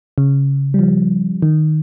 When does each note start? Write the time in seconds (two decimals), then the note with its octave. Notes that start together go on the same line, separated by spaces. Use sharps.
0.18 C#3
0.74 G3
0.79 F3
1.42 D#3